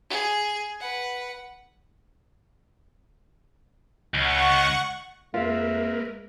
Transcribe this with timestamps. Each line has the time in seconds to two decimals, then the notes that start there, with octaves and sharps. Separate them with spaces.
0.10 G#4
0.81 B4 F#5
4.14 C#2 F#5 C#6
5.34 F2 G#3 A#3 F4 A#4 B4 E5